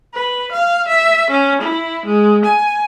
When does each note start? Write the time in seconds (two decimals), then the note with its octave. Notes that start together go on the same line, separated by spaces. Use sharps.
0.14 B4
0.52 F5
0.88 E5
1.30 C#4
1.62 E4
2.06 G#3
2.45 G#5